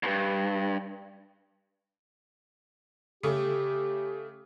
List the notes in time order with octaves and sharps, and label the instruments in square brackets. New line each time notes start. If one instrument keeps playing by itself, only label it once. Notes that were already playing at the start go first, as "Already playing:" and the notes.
[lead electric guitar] E2 G2
[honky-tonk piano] C#3 A3 [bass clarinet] G4